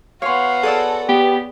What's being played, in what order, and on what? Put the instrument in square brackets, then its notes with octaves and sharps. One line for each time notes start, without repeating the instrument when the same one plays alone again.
[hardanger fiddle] B3 F#4 [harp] C#5 G#5 C6 [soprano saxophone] F5
[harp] G#4 D5 E6 [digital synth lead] A4
[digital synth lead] B3 [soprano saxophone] G4